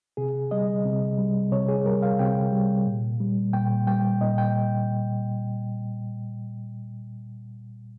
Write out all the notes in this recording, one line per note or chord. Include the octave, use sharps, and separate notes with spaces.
C3 G#4
G3 D#5
C3
G3
C3 C#5
G#4
G3 A#4
F5
C3 G5
G3
A#2
G3
A#2 G5
G3 G5
A#2 D#5
G5